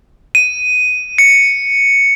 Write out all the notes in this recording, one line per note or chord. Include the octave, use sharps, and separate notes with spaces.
D#7
C#7